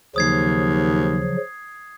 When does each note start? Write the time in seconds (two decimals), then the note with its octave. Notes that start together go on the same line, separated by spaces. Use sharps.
0.16 D#2 C#3 F3 F#3 D#6 G#6 C7